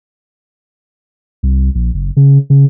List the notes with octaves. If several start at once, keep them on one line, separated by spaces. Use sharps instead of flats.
C2
A#1
F#1
C#3
C#3